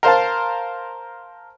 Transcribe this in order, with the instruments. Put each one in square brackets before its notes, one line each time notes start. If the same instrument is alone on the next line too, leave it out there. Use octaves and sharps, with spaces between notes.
[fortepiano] A#4 C5 F5 A5